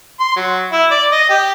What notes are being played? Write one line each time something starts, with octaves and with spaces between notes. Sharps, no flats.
C6
F#3
E4
D5
D#5
G4